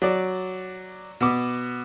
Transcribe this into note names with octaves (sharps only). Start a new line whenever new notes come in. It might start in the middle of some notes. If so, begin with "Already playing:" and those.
F#3 D5
B2 B3 D6